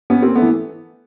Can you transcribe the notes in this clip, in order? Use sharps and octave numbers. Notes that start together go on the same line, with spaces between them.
B3 C#4
A#3 C4
A3 B3
E3